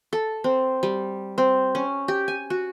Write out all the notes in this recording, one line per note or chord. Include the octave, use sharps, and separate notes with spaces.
A4
C4
G3
C4
C#4
G4
G#5
F#4